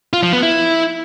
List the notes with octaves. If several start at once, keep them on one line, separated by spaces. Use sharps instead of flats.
F4
F3
B3
E4